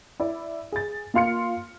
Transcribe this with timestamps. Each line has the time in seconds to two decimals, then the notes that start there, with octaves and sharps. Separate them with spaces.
0.20 E4 D5
0.72 G#4 A6
1.14 A#3 F4 F5 C6 F6 C#7